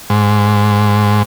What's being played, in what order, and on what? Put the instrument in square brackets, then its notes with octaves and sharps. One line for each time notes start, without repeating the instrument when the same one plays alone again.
[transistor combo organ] G#2